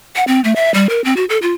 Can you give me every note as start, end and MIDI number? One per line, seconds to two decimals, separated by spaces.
0.16 0.24 78
0.27 0.40 60
0.44 0.54 57
0.56 0.72 76
0.74 0.89 55
0.90 1.03 70
1.05 1.16 60
1.16 1.25 66
1.30 1.38 69
1.42 1.54 65